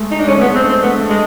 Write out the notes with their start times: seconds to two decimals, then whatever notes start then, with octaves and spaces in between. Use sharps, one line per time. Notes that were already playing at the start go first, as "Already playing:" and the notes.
Already playing: G#3 A3
0.11 D#4
0.20 D4
0.27 G#3 C#4
0.38 A3 B3
0.46 G#3
0.55 C4
0.64 D4
0.69 C4
0.82 A3 B3
1.00 A3
1.10 G#3